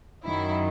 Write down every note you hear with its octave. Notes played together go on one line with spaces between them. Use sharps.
F#2 D#3 F#3 E4